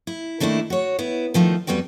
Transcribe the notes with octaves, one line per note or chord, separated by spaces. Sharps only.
E4
D#3 A3 A#3 D4 E4
F#4 C#5
B3 E4
D#3 F3 A3 D#4
F2 G3 B3 F#4 G5